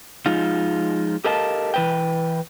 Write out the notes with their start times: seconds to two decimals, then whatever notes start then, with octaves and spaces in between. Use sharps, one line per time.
0.26 F3 G#3 D#4 F4
1.24 G4 A4 A#4 D#5 F5 A5
1.74 E3 B4 G5